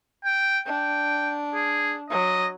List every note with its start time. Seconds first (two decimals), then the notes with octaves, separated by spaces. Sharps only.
0.24 G5
0.66 D4 G5
1.55 G#4
2.10 F#3 D#5